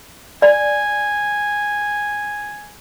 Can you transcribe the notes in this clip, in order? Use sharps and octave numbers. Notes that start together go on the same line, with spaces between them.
D5 G#5